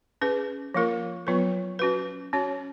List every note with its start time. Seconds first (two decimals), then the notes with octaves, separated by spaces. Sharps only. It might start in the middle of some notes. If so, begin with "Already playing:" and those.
0.21 C#4 G#4 B4
0.74 F3 A#3 F4 A#4
1.27 F#3 B3 F4 B4
1.79 C#4 F#4 B4
2.33 C#4 F#4 C#5